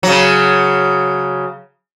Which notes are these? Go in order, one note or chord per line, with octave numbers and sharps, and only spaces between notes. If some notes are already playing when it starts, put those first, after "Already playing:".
C#3 F#3